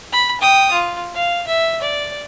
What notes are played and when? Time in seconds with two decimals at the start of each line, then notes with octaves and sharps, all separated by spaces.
0.12 B5
0.41 G5 D#6
0.72 F4
1.15 F5
1.47 E5
1.82 D5